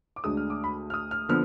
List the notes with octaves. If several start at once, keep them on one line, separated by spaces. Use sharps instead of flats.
D6
D2 D3 G#3 D4 D#6
F6
D6
B5
F6
D#6
F6
D3 F3 B3 F6